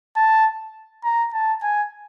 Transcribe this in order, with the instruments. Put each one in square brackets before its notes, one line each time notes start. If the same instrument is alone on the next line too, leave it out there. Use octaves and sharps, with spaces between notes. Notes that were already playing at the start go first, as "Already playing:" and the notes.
[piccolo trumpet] A5
A#5
A5
G#5